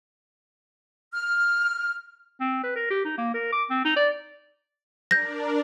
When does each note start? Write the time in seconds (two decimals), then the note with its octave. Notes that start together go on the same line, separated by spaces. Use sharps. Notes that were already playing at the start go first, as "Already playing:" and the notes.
1.13 F6
2.40 C4
2.64 B4
2.76 A#4
2.90 G4
3.05 D#4
3.18 A#3
3.34 A#4
3.53 D6
3.70 C4
3.85 D#4
3.96 D5
5.11 D4 A#4 D5 G6 A#6